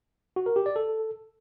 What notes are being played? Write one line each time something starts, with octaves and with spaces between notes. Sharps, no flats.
F#4
A#4
G4
D5
A4